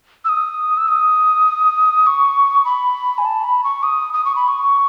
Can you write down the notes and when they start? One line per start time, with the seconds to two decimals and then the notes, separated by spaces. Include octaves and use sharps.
0.25 E6
0.29 D#6
0.78 E6
0.88 D#6
2.07 C#6
2.65 B5
3.18 G#5
3.25 A5
3.44 B5
3.64 C#6
3.83 D#6
4.13 D#6
4.25 C#6
4.36 B5
4.48 C#6